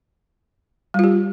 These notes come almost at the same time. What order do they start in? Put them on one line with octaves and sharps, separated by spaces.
G3 F4 G4